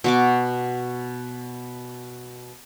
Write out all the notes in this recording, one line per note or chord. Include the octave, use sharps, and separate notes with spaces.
B2 F#4 D6